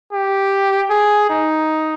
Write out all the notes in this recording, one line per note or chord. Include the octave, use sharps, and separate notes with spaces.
G4
G#4
D#4